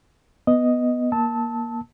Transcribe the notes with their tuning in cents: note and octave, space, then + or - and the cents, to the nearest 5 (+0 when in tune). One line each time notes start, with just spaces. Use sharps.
B3 +0 D#5 +0
A#3 +15 A5 +0 E6 -35